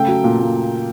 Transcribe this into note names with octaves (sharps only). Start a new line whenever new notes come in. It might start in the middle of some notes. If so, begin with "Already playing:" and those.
Already playing: C#3 A3 G5
F#3
A#2
A#2